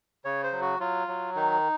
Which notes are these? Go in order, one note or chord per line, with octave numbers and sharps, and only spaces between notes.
C#3 C#5
C5
F#3
F#4
F#3 F4
F#3
D#3 D#4